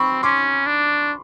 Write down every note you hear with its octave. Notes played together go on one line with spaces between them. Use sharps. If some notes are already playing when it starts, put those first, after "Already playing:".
Already playing: C4 B5 C#6
C#4 C6 D6
D4